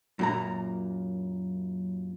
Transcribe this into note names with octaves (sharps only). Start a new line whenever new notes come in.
F#2 A#2 A#5